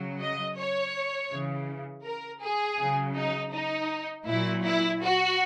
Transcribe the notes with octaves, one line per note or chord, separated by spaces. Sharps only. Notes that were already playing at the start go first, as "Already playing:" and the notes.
Already playing: C#3 F#3
D#5
C#5
C#3 E3
A#4
G#4
C#3 F#3
D#4
D#4
A#2 F#3 E4
E4
F#4